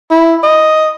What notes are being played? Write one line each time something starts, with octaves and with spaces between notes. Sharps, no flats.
E4
D#5